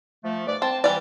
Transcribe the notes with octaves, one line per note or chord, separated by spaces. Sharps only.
F3 A3
G#2 B4 D5
C4 A5
E3 G3 D5